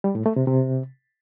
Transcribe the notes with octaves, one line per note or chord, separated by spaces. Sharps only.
G3
A2
A3
C3
C3